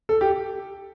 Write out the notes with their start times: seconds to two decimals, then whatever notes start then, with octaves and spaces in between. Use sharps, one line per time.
0.09 A4
0.21 G4